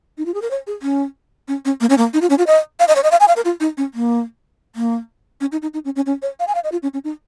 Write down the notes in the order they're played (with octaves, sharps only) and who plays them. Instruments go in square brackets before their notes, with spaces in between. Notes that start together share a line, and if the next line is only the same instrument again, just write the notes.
[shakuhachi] D#4
F4
G#4
A#4
C#5
G#4
C#4
C#4
C#4
A#3
C#4
A#3
D#4
F4
C#4
F4
D#5
F5
D#5
C#5
D#5
F5
G#5
F5
A#4
F4
D#4
C#4
A#3
A#3
C#4
D#4
D#4
D#4
C#4
C#4
C#4
C#5
F5
G#5
F5
D#5
F4
C#4
C#4
D#4